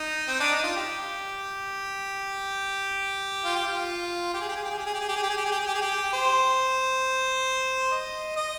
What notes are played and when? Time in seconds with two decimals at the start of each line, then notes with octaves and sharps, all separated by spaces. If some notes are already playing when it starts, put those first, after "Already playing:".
Already playing: D#4
0.28 C4
0.40 D4
0.52 D#4
0.64 F4
0.76 G4
3.45 F4
3.55 G4
3.65 F4
4.34 G4
4.41 G#4
4.48 G4
4.56 G#4
4.64 G4
4.70 G#4
4.78 G4
4.86 G#4
4.94 G4
5.00 G#4
5.09 G4
5.16 G#4
5.23 G4
5.30 G#4
5.37 G4
5.46 G#4
5.52 G4
5.60 G#4
5.67 G4
5.75 G#4
5.82 G4
6.13 C5
7.91 D#5
8.36 D#5